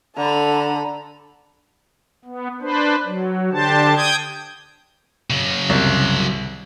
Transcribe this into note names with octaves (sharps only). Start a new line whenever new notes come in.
D3 A4 A#5 B5
B3
D4 B4 C5
F#3
D3 D4 G4 C5 A5
G5 D#6 G6 G#6
C#3 F#3
C2